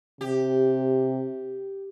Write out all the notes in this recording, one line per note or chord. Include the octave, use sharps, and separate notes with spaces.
C3 G4